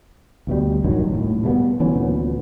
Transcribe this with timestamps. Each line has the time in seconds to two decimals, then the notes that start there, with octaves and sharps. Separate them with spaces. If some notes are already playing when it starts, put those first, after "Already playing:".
0.47 D2 B2 G3
0.85 A#1 G2 D#3 F#3
1.11 D#1 A2
1.43 B2 G3 A3 B3
1.80 D2 E3 B3 C#4
1.94 D2 A#2 B3